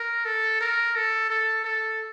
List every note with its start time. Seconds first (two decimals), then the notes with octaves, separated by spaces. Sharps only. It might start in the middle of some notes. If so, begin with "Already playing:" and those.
Already playing: A#4
0.25 A4
0.61 A#4
0.96 A4
1.30 A4
1.65 A4